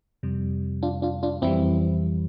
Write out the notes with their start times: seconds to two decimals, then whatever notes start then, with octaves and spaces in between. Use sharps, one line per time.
0.23 F2 C3 G3
0.83 D4 F4
1.02 D4 F4
1.23 D4 F4
1.42 F2 E3 G3 C4 E4